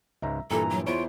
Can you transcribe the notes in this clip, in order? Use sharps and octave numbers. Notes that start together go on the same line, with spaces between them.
C#2 G#2 E5 A#5
G2 A#2 E3 A4 G#5 A#5
F#3
E2 E4 F4 C5 C#5 D7